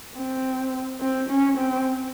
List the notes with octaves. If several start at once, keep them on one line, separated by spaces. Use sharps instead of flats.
C4
C4
C#4
C4